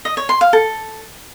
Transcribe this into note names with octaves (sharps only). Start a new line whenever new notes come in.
D#5
C#5
C6
F5
A4